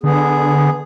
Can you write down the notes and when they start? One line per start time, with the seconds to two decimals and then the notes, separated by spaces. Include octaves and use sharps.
0.03 D3 B3 G#4